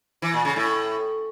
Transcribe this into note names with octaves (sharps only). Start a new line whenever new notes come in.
E3
A#2
C#3
A2